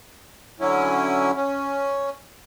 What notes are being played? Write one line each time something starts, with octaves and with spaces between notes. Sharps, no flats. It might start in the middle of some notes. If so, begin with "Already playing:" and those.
D3 F#3 C#4 E4
C#4